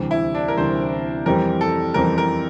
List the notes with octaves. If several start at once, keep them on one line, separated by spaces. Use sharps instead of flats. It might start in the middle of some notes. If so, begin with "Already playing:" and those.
Already playing: D2 C3 E3 G3
E4
D4
A#4
D2 C3 E3 G3 C5
F2 E3 G3 C4 G4 A#4
A4
F2 E3 G3 C4 G4 A#4
A#4